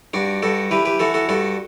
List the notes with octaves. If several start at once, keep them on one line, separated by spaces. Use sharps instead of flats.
G2 D4 F#4
G2 F#4 A4
E3 G4 B4
G4 B4
E3 F#4 A4
F#4 A4
G2 F#4 A4